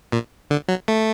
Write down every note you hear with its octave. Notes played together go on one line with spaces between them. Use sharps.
A#2
D3
F#3
A3